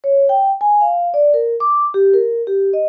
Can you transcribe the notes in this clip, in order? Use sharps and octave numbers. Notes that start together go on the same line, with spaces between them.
C#5
G5
G#5
F5
D5
A#4
D6
G4
A#4
G4
D#5